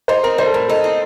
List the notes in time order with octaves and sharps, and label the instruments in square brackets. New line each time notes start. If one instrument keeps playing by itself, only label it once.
[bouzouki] D#4 [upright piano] C5
[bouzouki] C4 [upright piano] A#4
[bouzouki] G3 [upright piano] C5
[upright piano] A4
[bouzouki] A2 [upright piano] A#4
[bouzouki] D#4 [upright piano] A4
[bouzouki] C4